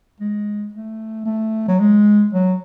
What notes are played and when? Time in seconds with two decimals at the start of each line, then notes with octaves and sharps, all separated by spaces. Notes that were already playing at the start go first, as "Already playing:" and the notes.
0.20 G#3
0.73 A3
1.26 A3
1.68 F#3
1.80 G#3
2.33 F#3